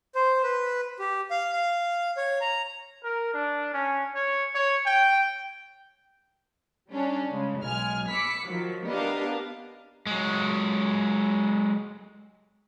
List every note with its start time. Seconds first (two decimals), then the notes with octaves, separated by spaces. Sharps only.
0.15 C5
0.43 B4
0.99 G4
1.30 F5
1.53 F5
2.17 C#5
2.41 A#5
3.04 A#4
3.34 D4
3.74 C#4
4.15 C#5
4.55 C#5
4.86 G5
6.90 G3 C#4 D4
7.28 C#3 G#3
7.62 B1 G#3 G#5 F6
8.10 B5 D6 E6 B6 C#7
8.45 D#3 F3 F#3
8.88 B3 D4 G4 A#4 D#5 F5
10.07 F#3 G#3